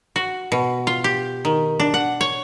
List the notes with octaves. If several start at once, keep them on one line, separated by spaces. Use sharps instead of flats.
F#4
B2
F4
G4
D#3
D4
F#5
C#5